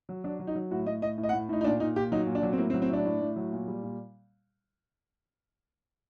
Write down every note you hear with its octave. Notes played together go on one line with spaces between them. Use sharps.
F#3
F#3 D4
F#3
D#4
F#3
A2 F#4
A2 D#5
A2 D#5
A2
D#5
F#5
A2
A2 D#4
D#4
A#2 D4
A#2 D#4
A#2 G4
F#3 D#4
A#2
D4
F#3
C4
A2 A#3
C4
F#3
C4
A2 D4
A2
A2
F#3
A#2
G3
A#2